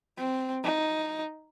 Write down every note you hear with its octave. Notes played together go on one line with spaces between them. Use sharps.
C4
D#4